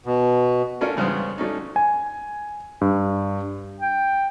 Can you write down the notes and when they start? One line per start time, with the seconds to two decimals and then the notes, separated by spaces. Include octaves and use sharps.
0.06 B2
0.81 A3 C#4 D4 F4 A4 A#4
0.96 E2 G2 C#3 G#3 B3 C5
1.38 G3 A3 C#4 D#4
1.76 G#5
2.81 G2
3.81 G5